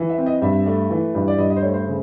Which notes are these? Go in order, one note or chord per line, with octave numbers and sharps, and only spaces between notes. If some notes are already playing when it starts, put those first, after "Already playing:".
Already playing: E3
E5
C4
D#5
G2 E5
A3
E3
G2
D5
G2 D#5
D#5
C5
A3 C#5
C5
C#3